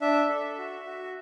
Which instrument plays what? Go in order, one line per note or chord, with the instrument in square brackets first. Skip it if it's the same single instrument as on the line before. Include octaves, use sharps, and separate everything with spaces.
[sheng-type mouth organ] D4 E5
A4
F#4
F#4